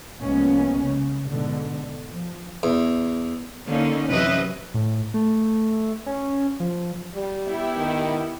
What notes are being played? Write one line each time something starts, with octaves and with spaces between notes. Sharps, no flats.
C2 F3 G#3 A#3 B3 C#4
C#3
G#2 B2 D3
F3
E2
D3 A#3 C#4 D#4
F#2 C3 E3 B4 D#5 E5
A2
A3
C#4
F3
G3
B3 E4 G4
D#3